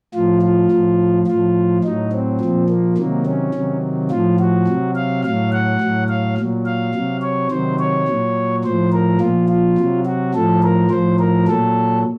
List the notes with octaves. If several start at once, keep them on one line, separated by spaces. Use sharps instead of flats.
A2 F3 F4
F4
A2 F3
A2 F3 F4
A2 F#3 D#4
C4
A#2 F3
A#3
C3 D#3 F#3 A#3
C#4
C3 D#3 F#3
A2 F3 F4
F#4
C3 F#3
F5
A2 F#3 F5
F#5
A2 F#3
F5
A#2 F#3
F5
C3 F#3
C#5
C3 D#3 F#3 C5
C#5
A#2 F#3
A2 F3 C5
A#4
A#2 F3 F4
F4
C3 F#3
F#4
A2 F3 A4
A#4
A2 F3 C5
A#4
A#2 F#3 A4